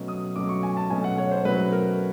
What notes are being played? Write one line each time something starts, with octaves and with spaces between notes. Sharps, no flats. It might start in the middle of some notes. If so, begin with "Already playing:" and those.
Already playing: B2 F#3 A3 C#4
D#6
B2 F#3 A3 C#4 D6
C#6
G#5
A5
B2 F#3 A3 C#4 G#5
F#5
C#5
C5
B2 F#3 A3 C#4 B4
A#4